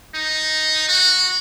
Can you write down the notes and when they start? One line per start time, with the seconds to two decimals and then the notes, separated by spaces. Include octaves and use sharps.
0.15 D#4
0.88 F#4